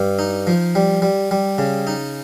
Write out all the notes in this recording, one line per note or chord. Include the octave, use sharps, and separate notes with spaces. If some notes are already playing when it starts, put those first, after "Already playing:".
Already playing: G2
D#4
F3
G3
G3
G3
C#3
D#4